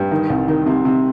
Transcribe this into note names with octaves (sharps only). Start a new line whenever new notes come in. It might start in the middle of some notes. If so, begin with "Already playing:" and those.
Already playing: G2
D#3
C2
D#3
C3
C3